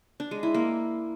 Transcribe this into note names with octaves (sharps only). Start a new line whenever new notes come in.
D4
G#3
E4
A#3